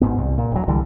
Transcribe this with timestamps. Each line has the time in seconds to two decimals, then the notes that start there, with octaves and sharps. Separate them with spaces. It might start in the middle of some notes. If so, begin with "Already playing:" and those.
0.01 G#1 G#2 B3
0.18 C2
0.38 A#2
0.52 E1 F#3
0.68 C2 D3 E3 G3